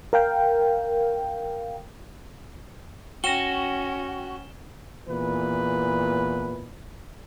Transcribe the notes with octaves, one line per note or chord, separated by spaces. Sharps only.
A#4 F5 G5
C#4 F#4 G5 A#6 E7 G7
E2 A#2 E3 B3 B4